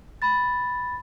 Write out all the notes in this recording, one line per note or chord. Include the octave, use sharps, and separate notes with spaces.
B5 A6